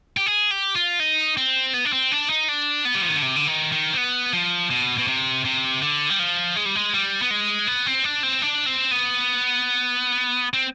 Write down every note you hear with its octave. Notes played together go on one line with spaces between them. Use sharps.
G4
G#4
G4
F4
D#4
C4
B3
D4
C4
D4
D#4
D4
B3
G3
F3
D#3
D3
C3
D3
D#3
D#3
C4
B3
F3
B2
B2
C3
C3
D3
G3
F3
G#3
G3
G#3
G3
B3
G#3
B3
C4
D4
C4
D4
C4
B3
C4